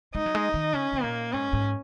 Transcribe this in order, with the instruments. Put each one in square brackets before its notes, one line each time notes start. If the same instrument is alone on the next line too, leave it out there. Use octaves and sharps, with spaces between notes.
[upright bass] G#3 [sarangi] D#4
[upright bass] F#3
G#3
D#3
[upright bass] C#3 [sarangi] C#4
[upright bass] C#3
[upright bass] A#2 [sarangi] A#3
[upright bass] G#2 [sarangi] C#4
[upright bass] G#2